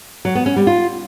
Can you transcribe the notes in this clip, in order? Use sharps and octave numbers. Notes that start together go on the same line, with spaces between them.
F#3
B3
C#4
G3
F4